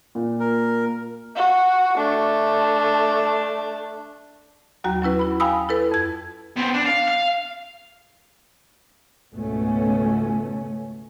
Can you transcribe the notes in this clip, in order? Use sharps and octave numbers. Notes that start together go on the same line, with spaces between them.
A#2
A#4
F#4
A3 D4
D#2 F#3 F#4 G5 A#5
F#3 C#4 E4 B4
E4 B5
F5 G5 G#5 B5 D#6 E6
E4 A4 B4
F2 G#6
B3 C4
D4
F5
F5
C#2 G#2 B2 A3 C#4